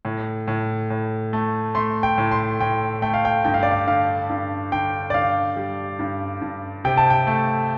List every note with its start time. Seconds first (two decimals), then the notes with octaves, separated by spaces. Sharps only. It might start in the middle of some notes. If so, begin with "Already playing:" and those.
0.05 A2
0.48 A2
0.90 A2
1.33 A3
1.75 A3 C6
2.03 G5
2.18 A2
2.31 C6
2.60 A2 G5
3.02 A3 G5
3.14 F5
3.25 G5
3.45 G2 G5
3.54 F5
3.63 D5
3.71 F5
3.87 D3 F5
4.30 G2
4.72 D3 G5
5.10 D5
5.14 G2 F5
5.56 G3
5.99 G2
6.42 G2
6.85 C3 G5
6.97 A5
7.10 G5
7.27 A3